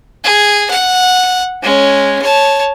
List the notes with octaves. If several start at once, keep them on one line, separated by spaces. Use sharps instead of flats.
G#4
F#5
G#3 C#4
C#5 A5